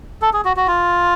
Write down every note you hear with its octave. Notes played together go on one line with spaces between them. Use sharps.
A4
G#4
F#4
F#4
F4